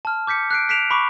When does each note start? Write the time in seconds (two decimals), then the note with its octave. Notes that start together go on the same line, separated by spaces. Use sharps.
0.05 A5 F6
0.27 D6 G6 B6 C#7
0.51 F#6 C7 D7
0.69 F#6 B6 C7 D7 E7 F7
0.91 B5 C#6 D6 D7